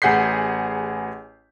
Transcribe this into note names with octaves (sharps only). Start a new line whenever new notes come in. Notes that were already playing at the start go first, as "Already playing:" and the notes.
A1 G#4 F#5 G6 B6 C7